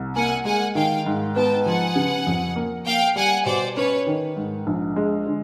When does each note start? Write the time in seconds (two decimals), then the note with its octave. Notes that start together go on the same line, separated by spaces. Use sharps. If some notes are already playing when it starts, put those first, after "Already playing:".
Already playing: C2
0.16 A#3 F#5 G#5
0.45 G#3 F#5 G#5
0.75 D#3 F5 G5
1.06 G#2
1.36 B3 G5 A5
1.65 F3 F#5 G#5
1.96 C#3
2.27 F2
2.56 A#3
2.86 A#3 F5 G5
3.16 G3 F#5 G#5
3.46 B2 C5 D5
3.77 C#4 B4 C#5
4.07 D#3
4.36 G#2
4.67 A#1
4.96 G#3
5.26 D3